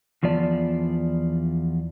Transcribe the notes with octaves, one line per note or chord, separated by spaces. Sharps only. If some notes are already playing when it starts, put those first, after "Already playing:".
E2 F3 B3 D5 A5